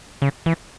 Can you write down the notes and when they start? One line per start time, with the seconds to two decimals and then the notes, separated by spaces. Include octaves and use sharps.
0.22 C#3
0.46 E3